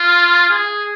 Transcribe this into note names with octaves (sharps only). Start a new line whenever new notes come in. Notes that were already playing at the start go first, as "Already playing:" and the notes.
Already playing: F4
G#4